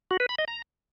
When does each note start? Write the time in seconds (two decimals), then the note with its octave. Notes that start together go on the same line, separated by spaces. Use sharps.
0.11 F#4
0.20 B4
0.29 B5
0.38 D#5
0.48 A#5